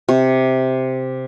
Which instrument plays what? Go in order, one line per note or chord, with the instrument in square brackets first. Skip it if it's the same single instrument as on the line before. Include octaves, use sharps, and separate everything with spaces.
[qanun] C3